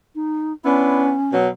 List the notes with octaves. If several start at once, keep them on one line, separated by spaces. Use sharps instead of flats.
D#4
B3 C#4 D4 E4
B2 F#3